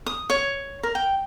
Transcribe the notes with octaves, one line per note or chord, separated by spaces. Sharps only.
D#6
C#5
A#4
G5